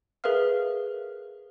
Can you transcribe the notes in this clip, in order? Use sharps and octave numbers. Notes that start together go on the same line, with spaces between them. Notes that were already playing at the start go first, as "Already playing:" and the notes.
G#4 A#4 B4 E5 F5 F6